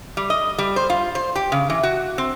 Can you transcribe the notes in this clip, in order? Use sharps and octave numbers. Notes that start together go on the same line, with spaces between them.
G3
D#5
G3
C5
F4
C5
G4
C#3
E3
F#4
C4